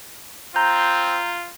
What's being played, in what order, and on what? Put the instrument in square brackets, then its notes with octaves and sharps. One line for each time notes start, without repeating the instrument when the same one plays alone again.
[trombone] C4 [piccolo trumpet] F4 [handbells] A#5 G6